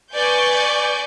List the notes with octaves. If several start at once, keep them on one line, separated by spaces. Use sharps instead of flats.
B4 D5 G#5 C#6 G6